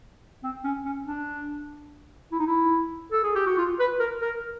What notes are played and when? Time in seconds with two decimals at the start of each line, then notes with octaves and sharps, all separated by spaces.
0.43 C4
0.64 C#4
0.85 C#4
1.06 D4
2.31 E4
2.39 D#4
2.46 E4
3.12 A4
3.23 G#4
3.35 G4
3.46 F#4
3.58 F4
3.79 B4
3.99 A#4
4.21 A#4